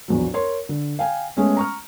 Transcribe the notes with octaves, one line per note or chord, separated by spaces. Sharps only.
A#1 E2 F#3
A#4 C#5 C6
D3
F5 G5 G#5
G#3 A3 B3 C#4
A#5 C#6 F6